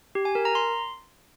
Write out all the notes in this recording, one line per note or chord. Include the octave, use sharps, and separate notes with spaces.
G4
G#5
A#4
A#5
C6